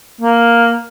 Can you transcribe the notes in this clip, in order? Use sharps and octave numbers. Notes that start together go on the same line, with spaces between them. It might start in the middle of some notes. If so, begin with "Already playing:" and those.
A#3